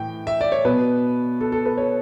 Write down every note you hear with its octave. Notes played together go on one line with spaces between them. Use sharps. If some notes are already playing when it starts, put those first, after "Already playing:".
Already playing: A2 E3 G5
E5
D5
C#5
B2 B4
A4
A4
B4
C#5